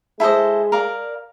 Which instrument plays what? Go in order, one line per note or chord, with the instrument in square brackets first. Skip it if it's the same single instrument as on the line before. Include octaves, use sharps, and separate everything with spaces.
[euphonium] G#3 [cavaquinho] E4 A4 C5 D#5
[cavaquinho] A#4 D5 F5